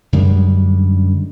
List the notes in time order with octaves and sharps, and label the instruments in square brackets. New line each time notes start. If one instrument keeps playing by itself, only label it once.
[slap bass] F#2 D3 G3 G#3